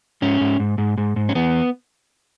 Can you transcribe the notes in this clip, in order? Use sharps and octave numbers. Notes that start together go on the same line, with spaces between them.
G#2 C#4
G#2
G#2
G#2
G#2
G#2
C#4
E2 B3